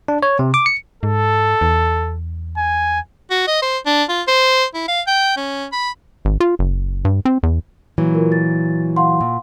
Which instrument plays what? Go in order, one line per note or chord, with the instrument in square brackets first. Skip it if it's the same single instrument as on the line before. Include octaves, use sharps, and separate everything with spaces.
[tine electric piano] D4
C#5
C3
D6
C#7
[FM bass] G#2 [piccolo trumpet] A4
[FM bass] E2
[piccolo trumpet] G#5
[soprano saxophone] F#4
D#5
C5
D4
F4
C5
E4
F5
G5
C#4
B5
[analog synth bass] G#1
F4
F#1
G2
C4
E2
[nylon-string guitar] A#2 E3 F#3
[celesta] F4 A#4
A6
F5 F#5 C6
[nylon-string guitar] A#2